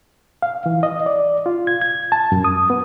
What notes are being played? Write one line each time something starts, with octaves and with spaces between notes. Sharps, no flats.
F5
E3
D#5
D5
F4
G#6
G#6
A5
F#2
D#6
B3